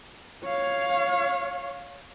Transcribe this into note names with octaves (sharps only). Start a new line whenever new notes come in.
C#5 F5